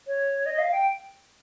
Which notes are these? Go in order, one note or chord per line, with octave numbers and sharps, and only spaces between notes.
C#5
D#5
F5
G5